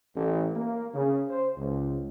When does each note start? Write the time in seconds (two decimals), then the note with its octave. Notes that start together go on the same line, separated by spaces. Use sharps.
0.16 A1
0.55 A#3
0.94 C#3
1.29 C5
1.57 C#2